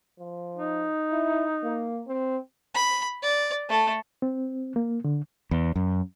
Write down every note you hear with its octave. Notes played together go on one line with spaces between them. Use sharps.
F3
D#4
E4
A#3
C4
B5
D5
A3 A4
C4
A#3
D3
E2
F#2